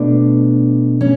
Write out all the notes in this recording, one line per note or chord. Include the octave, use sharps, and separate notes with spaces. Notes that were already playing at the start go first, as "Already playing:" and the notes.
Already playing: B2 A3 D4
C#4